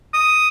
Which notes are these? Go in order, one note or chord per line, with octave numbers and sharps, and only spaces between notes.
D#6